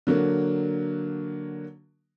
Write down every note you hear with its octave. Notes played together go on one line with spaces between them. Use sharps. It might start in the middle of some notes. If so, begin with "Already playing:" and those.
D3 F#3 A#3